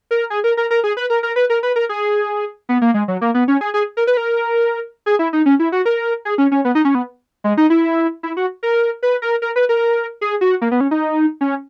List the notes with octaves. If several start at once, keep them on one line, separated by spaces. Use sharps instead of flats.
A#4
G#4
A#4
A#4
A#4
G#4
B4
A#4
A#4
B4
A#4
B4
A#4
G#4
B3
A#3
G#3
F#3
A#3
B3
C#4
G#4
G#4
A#4
B4
A#4
G#4
E4
D#4
C#4
E4
F#4
A#4
G#4
C#4
C#4
B3
D#4
C#4
B3
G#3
D#4
E4
E4
F#4
A#4
B4
A#4
A#4
B4
A#4
G#4
F#4
A#3
B3
C#4
D#4
C#4